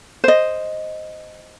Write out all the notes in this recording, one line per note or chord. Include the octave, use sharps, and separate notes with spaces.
C5 D#5